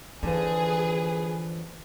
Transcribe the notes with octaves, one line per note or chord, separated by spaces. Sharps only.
D3 E3 F3 G#4 B4